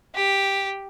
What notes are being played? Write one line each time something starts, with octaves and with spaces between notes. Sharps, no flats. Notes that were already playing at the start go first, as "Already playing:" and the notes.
G4